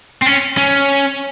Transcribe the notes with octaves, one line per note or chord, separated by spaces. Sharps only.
C4
C#4
C#4